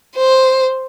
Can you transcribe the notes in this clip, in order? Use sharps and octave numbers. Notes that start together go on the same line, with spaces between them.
C5